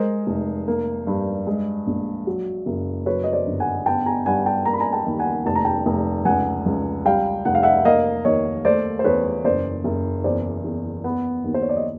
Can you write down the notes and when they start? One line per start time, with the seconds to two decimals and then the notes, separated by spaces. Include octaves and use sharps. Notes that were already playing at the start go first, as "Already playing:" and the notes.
Already playing: G#3 A#4 C5
0.27 F1
0.68 A#3
1.07 G2
1.47 G#3
1.87 A#1
2.27 F#3
2.66 F#1
3.06 F#3 B4 C#5
3.24 D#5
3.33 C5 D5
3.47 G1
3.60 F#5 G#5
3.86 B3 G5 A5
4.06 G#5 A#5
4.26 G2 F#5 G#5
4.46 G5 A5
4.66 A#3 A#5
4.73 B5
4.80 G#5 A#5
4.93 G5 A5
5.06 D#2
5.19 F#5 G#5
5.46 F1 A5
5.55 A#5
5.65 G5 A5
5.86 F1
6.25 C#2 F#5 G#5
6.66 C#2
7.05 G3 F5 G5
7.45 F1 F#5
7.55 F5
7.63 E5 F#5
7.85 A#3 D#5 F5
8.25 D#2 C#5 D#5
8.65 A3 C5 D5
8.99 C5
9.04 E2 B4 C#5
9.44 F#1 C5 D5
9.84 F#1
10.24 E2 C5 D5
10.64 E2
11.04 B3
11.44 D#2
11.54 C5
11.62 C#5
11.69 D5
11.76 D#5